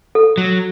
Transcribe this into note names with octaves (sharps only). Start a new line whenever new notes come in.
A4
F#3